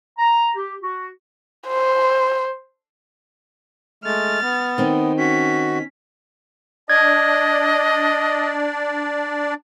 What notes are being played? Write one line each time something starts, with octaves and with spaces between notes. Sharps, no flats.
A#5
G4
F#4
C5
G#3 A3 F6 A6
B3
D#3 C4 D#4
C#4 F#4 B6
D4 D5 D#5 G#6